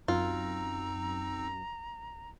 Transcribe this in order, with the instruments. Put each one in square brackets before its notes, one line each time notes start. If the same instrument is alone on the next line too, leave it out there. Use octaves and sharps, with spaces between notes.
[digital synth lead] F#2 [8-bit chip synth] C4 D#4 E6 [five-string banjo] F4 [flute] A#5